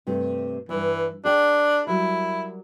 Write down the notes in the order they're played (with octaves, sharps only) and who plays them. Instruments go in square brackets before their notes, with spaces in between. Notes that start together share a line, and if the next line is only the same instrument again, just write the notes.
[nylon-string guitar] G2 C3 A3
[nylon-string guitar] E2 G2 [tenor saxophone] E3
[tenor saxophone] D4 [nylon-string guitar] G#4 G5
[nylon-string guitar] F#3 G3 A#4 [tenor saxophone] E4